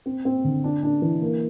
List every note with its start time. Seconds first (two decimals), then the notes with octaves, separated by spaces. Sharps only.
0.06 C4
0.25 C4
0.45 D3
0.64 D4
0.83 D4
1.02 E3
1.22 A#3